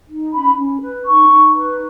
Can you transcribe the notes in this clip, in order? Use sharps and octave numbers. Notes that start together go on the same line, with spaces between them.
D#4
C#4 B5
C#4
B4
D#4 C#6
D#4
B4